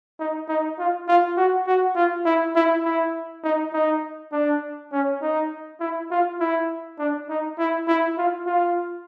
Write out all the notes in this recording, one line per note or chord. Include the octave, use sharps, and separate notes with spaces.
D#4
D#4
F4
F4
F#4
F#4
F4
E4
E4
E4
D#4
D#4
D4
C#4
D#4
E4
F4
E4
D4
D#4
E4
E4
F4
F4